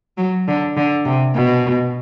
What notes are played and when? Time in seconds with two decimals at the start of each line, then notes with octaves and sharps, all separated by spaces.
0.18 F#3
0.48 D3
0.77 D3
1.06 C3
1.36 B2